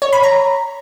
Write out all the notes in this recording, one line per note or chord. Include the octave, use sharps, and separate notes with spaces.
C#5
B5
A#5